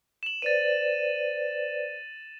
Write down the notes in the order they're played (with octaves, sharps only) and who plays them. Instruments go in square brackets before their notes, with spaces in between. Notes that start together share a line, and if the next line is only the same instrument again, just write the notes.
[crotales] E7 F#7
[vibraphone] B4 C5 D5 [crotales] A6 D#7